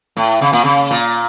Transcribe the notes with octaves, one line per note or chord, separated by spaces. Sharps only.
A2
C#3
A#2
C#3
A#2